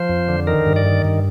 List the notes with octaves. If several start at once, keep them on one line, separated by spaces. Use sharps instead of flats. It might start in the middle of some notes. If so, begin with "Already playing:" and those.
Already playing: F3 C5
F2
D3
D#3 A#4
G2
D5
D#3
G2